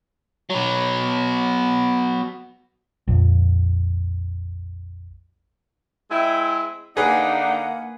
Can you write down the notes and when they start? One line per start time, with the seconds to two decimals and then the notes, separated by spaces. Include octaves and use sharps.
0.50 F#3 B3
3.08 A#1 F2
6.11 G#3 C4 E4
6.97 D3 A#3 D4 D#4 G#4 B4 F#5